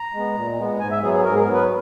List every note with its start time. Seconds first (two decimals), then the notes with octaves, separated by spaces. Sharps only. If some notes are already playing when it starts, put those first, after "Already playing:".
Already playing: A#5
0.14 G#3 B3
0.36 A#2
0.58 G#3 B3
0.80 G#2 G#5
0.91 E5
1.02 F#3 B3 G#4
1.14 G#4
1.25 G#2 A#4
1.35 G#4
1.39 A#4
1.47 F#3 B3
1.54 B4